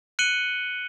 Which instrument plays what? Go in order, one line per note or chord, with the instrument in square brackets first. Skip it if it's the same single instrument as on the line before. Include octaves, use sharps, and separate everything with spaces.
[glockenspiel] F#6 C#7 D#7 F#7 G7